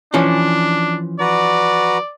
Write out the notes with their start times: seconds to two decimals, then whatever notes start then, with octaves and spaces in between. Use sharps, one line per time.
0.14 E3 F3 C#4 D4
1.20 F#4 B4 D5 A#5